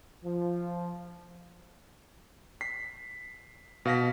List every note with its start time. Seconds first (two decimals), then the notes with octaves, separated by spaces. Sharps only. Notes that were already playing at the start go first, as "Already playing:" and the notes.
0.23 F3
2.61 B6 C7
3.85 B2 F5 A#6 B6